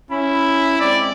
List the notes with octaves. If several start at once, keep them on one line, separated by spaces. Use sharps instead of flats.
C#4 E4 B5
G#3 C4 D5